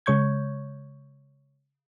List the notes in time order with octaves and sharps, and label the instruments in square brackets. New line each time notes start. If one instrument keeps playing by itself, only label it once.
[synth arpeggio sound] C#3 G#3 C#5 C#6 G6 G#6